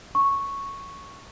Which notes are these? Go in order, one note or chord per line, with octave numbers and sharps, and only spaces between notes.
C#6